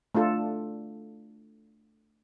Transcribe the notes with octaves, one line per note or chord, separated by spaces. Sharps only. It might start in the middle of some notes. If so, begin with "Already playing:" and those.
A3 D4 F4 A4